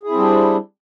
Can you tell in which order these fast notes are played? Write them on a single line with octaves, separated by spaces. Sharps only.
G#4 E4 C4 G3 D4